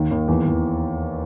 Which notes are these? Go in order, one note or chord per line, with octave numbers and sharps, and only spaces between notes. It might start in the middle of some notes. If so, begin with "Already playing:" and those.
Already playing: D#2 D#3
D#2
E2
E2